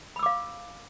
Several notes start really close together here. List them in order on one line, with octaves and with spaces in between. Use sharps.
B5 E6 D6 F5